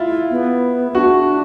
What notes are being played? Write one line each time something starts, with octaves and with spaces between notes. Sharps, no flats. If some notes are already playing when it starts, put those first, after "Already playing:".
Already playing: E4 F4
B3
D4 F#4